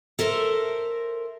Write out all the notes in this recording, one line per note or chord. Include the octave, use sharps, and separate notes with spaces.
A4 A#4 C5 E5